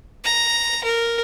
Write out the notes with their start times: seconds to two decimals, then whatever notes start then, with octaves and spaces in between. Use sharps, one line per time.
0.24 A#5
0.84 A#4